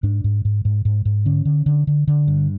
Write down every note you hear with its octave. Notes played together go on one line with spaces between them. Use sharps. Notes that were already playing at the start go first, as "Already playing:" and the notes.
G#2 D4
G#2
G#2
G#2
G#2
G#2
D3 C#4
D3
D3
D3
D3
G2